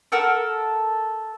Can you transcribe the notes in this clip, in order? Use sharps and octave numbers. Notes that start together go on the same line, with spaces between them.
A4 A#4 F#5 E6